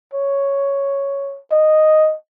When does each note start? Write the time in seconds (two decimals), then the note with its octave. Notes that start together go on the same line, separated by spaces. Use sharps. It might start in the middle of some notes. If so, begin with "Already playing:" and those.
0.13 C#5
1.52 D#5